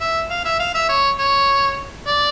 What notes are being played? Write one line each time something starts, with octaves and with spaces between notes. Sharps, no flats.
E5
F5
E5
F5
E5
C#5
C#5
D5